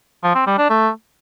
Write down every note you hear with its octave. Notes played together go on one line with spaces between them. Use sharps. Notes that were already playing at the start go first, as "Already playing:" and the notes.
F3
C4
G3
D4
A3